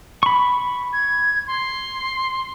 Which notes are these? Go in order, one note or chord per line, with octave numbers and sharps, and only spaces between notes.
B5 C#6
G#6
C6